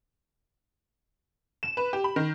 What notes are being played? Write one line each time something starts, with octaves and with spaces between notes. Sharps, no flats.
E7
B4
G4
B5
D#3